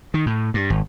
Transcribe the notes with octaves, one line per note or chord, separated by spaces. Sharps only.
D#3
A2
G2
G#1